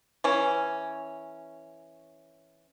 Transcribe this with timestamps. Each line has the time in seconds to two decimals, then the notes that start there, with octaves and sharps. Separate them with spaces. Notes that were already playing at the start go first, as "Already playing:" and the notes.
0.24 E3 C#4